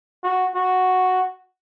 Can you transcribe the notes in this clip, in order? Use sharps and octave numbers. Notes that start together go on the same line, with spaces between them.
F#4
F#4